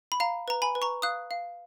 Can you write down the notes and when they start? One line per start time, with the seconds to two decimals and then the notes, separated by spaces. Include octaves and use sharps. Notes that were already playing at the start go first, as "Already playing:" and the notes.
0.12 B5
0.20 F5 A#5
0.48 B4 A#5
0.62 G#5 B5
0.75 B4
0.82 A#5 C#6
1.02 F5 D#6 F#6
1.31 F5